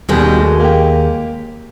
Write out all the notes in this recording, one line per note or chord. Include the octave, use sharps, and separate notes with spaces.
D#2 B2 D#3 G3 G#3
A3 F#4
A#3 G4